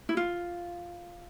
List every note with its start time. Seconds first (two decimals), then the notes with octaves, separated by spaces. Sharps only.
0.09 E4
0.17 F4